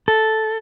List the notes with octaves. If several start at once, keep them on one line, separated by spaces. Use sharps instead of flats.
A4